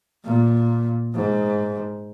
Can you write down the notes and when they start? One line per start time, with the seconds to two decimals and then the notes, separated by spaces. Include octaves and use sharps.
0.25 A#2
1.15 G#2